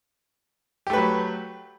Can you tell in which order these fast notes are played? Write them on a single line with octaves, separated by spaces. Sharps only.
G4 A3 B4 F#3